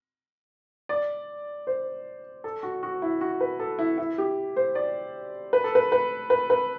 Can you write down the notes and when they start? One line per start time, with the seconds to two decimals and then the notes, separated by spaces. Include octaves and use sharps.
0.89 D5
1.67 C5
2.44 A4
2.63 F#4
2.83 F#4
3.02 E4
3.21 F#4
3.41 B4
3.60 A4
3.79 E4
3.98 E4
4.18 G4
4.56 C5
4.75 D5
5.53 B4
5.64 A4
5.75 B4
5.92 B4
6.30 B4
6.50 B4